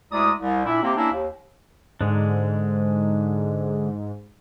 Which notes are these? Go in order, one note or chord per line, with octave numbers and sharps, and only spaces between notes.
D2 G#3 E4 D5 A#5 D#6
C2
A#2 D4 E4
C3 A#3 C4 G4
A#3 C#4 D4 E4
D#2
G#2 D3 G#3 D4